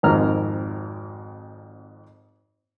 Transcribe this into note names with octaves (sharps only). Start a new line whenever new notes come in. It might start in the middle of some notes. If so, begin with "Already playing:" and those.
G#1 F2 G#2 A#4 A#5 F6